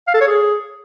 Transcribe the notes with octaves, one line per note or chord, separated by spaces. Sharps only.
F5
A4
C#5
G#4